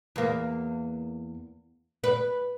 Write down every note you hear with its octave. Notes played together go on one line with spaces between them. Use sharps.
E2 A#3
B4